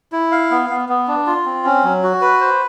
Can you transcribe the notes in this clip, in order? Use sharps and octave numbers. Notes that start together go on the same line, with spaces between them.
E4
F5
B3
B3
B3
D4
F4
C4
C#4
F#3
F#4
B4
C5